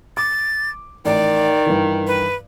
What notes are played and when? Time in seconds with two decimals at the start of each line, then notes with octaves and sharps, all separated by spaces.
0.17 D6 A6
1.05 A1 D#3 D5
1.66 G2 E3
2.07 B4